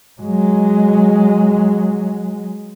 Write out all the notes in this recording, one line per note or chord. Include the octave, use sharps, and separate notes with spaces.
F#3 G#3